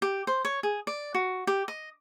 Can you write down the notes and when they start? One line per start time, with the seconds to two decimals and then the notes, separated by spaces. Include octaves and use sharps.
0.02 G4
0.27 C5
0.45 C#5
0.63 G#4
0.87 D5
1.14 F#4
1.47 G4
1.68 D#5